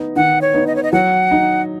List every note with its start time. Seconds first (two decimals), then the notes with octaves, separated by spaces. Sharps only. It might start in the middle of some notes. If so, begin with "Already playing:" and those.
Already playing: B3 D#4
0.16 D#3 F#5
0.41 C#5
0.54 B3 D#4
0.67 D#5
0.76 C#5
0.83 D#5
0.93 F#3 F#5
1.31 D#4